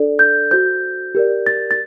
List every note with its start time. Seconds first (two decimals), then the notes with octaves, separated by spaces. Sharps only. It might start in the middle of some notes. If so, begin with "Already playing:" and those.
Already playing: D4 A4 D5
0.19 G6
0.51 F#4 C5 G6
1.15 G4 A#4 D5
1.47 A6
1.71 A6